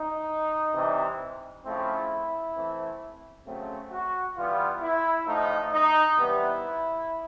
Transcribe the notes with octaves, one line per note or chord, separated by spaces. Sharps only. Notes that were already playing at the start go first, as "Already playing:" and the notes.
Already playing: D#4
C3 E3 G3 C4
C#3 F3 A3 C4 E4
E3 A3 C4
C#3 F#3 A3 C4
F#4
E3 G3 B3 F4
E4
A2 F3 A3 D#4
D#4
C3 E3 G3 B3 E4